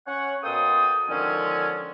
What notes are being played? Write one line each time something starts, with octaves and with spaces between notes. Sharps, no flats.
C#4 C#5 F#5
B2 A#3 A4 C5 G5 D#6
D3 D#3 F3 G#3 C4 C#4